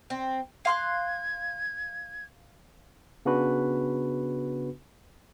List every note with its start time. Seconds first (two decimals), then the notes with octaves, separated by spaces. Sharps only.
0.10 C4
0.65 F5 C6 F#6 G#6
3.25 C#3 B3 D4 F#4 B4